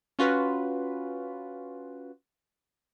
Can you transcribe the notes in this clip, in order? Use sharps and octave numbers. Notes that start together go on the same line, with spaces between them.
C#4 F4 F#4 B4